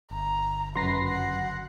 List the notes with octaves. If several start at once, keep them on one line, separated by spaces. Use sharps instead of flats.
G1 A#5
C#2 F#2 F#4 B4 C6 A#6 C7
F#5